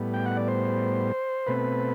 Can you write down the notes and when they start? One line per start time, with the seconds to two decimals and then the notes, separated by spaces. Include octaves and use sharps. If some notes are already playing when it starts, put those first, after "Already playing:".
Already playing: A2 G3 B3
0.14 G5
0.26 F#5
0.37 D5
0.48 C5
1.47 B2 A3 C4 B4